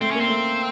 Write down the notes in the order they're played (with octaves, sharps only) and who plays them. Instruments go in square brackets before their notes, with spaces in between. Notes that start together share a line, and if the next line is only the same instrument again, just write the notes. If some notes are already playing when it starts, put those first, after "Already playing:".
[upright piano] A3 [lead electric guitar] C4
[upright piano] A#3 [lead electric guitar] C#4
[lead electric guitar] C4
[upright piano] A3